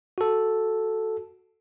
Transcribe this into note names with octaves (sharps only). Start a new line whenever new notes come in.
F#4 A4